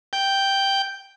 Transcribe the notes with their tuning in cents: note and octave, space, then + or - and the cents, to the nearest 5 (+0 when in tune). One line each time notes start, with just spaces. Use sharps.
G5 +0